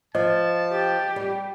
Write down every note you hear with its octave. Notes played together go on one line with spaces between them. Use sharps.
F3 D#5 A5
G4
G3